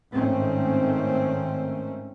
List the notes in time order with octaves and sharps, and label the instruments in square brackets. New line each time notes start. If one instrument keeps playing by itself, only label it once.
[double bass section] G#1 A2 D#3 A3 C4 C#4